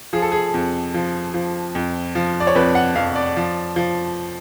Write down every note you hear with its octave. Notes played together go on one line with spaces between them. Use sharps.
F3 G#4
A4
G#4
F2
F3
F3
F2
F3
D5
C#5
F2 B4
F#5
F2 F5
D5
F3
F3